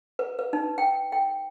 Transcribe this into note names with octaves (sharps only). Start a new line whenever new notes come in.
B4
B4
D#4
G5
G5